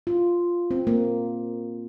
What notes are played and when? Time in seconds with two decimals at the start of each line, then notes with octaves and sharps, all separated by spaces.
0.07 F4
0.71 C4
0.87 A#3